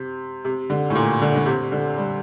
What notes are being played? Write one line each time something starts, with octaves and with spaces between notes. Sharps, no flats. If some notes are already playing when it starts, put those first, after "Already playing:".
Already playing: C3
C3
D3
A2
A#2
D3
D3
C3
D3
G3